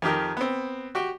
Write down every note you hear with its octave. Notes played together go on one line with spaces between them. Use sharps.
F2 D#3 G4 A#4
B3 C4
F#4 G4 G5